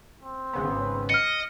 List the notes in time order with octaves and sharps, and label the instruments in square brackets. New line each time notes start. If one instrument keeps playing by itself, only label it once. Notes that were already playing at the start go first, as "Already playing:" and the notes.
[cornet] C4
[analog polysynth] G#1 C#3 B3
[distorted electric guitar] D#5 [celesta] F6 C#7